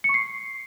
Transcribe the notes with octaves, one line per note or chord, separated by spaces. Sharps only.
C#7
C#6
C7